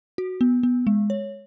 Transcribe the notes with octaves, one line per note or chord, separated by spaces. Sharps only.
F#4
B3
B3
G#3
C#5